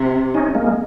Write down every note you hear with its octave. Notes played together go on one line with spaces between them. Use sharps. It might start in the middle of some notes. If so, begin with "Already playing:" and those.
Already playing: C3
C#4 D#4
G#3 A#3